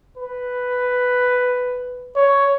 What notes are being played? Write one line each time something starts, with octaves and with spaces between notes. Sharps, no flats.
B4
C#5